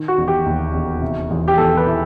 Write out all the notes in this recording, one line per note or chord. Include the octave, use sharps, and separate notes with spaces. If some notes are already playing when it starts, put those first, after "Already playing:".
Already playing: D#3
F#4
E1
G4
D#2
E1
C3
E2
G4
E2 A4
B4
E3